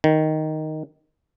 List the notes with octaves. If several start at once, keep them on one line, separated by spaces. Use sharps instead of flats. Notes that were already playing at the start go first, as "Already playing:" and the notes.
D#3